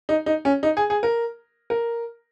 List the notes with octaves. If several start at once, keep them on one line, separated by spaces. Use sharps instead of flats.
D#4
D#4
C#4
D#4
G#4
G#4
A#4
A#4